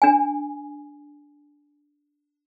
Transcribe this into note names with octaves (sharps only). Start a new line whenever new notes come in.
D4 G#5